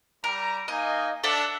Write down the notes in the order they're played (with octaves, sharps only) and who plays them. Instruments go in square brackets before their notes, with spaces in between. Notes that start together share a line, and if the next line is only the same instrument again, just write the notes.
[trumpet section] G3 A#5 [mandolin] A#4
[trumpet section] A#3 D#4 G#5 [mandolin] D#5
[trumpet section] D4 [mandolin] A4 E5 F#5